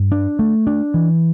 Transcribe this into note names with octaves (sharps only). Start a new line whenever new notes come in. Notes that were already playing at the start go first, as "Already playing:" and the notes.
Already playing: G2
D4
A3
D4
E3